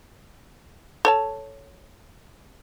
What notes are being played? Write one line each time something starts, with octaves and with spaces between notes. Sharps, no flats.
A4 C#5 A5